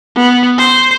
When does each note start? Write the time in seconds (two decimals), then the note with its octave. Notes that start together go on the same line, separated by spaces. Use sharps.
0.16 B3
0.58 C5